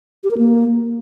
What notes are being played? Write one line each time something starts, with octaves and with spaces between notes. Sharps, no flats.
G4
A#4
A#3